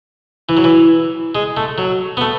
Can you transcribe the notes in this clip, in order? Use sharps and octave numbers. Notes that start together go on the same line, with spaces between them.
E3
F#3
E3
G#3
A3
F#3
B3
A3